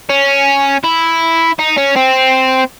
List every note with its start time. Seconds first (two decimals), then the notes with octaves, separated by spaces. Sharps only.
0.10 C#4
0.84 E4
1.59 D#4
1.77 C#4
1.96 C4